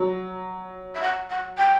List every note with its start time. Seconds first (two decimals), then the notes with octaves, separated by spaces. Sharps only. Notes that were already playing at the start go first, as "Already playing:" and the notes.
Already playing: F#3
0.95 E5
1.02 F#5
1.30 F#5
1.57 G5